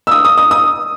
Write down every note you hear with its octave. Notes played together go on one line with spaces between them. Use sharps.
E6
D#6
D#6
D#6
D#6